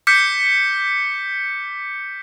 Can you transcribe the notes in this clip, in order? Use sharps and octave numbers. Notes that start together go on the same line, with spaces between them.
D6 F6 G6 B6 C#7